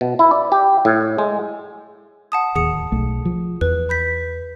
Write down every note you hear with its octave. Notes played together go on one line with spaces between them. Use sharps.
B2
E4
D5
G4
A2
G#3
F#5 A5 D#6
D1 D#2 G#4 D#6 C#7
B1 A3
F3
E2 B4
B5 G6 B6